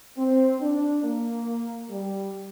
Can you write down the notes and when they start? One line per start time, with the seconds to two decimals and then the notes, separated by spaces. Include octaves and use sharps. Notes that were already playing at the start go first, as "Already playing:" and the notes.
0.17 C4
0.61 D4
1.03 A#3
1.90 G3